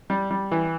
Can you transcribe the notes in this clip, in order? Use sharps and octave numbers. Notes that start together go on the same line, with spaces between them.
G3
G3
E3